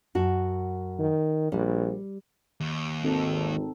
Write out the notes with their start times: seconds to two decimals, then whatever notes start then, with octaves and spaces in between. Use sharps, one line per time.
0.15 F#2 F#4 A5
0.99 D#3
1.52 A#1 G3
2.60 D#2
3.04 G#1 C4 D#4 A4